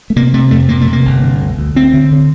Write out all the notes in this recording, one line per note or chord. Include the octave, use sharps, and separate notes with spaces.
A3
C3 A#3
C3 A3
F2 A3
C3 A#3
A3
C3
A#3
G1
D3
D2
D2
D2 C4
D3
D3